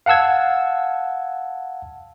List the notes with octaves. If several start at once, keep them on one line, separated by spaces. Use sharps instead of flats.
F5 F#5 A5 E6 G#6